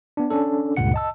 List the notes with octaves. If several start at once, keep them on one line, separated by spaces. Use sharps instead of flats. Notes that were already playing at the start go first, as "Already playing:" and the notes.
B3 D4
C#4 D4 A4
C#2 G2 A#2 C#3 F#5 C#7
D#5 A5 E6